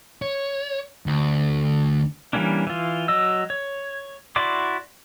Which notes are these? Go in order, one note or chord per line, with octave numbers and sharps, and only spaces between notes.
C#5
D2
E3 G3 A#3 C#4 D4
E3 F4
F#3 D#5 E6
C#5
E4 F#4 D5 C6 D6